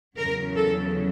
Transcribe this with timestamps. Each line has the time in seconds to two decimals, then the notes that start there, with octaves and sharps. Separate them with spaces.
0.17 E2 C#3 F#3 A#4
0.56 A4